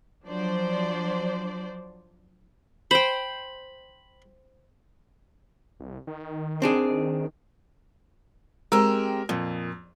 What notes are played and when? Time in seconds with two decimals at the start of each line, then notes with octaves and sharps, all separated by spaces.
0.25 F3 F#3 D4 C5 D5
2.91 C5 G5 B5
5.80 C2
6.07 D#3
6.62 C4 D4 G#4
8.72 G#3 C4 G4 A#4 E6
9.29 F2 A#2